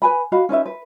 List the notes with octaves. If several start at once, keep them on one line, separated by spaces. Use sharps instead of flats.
B4 G#5 B5
F#4 D#5 F5 B5
C#4 D#4 B4 E5
B4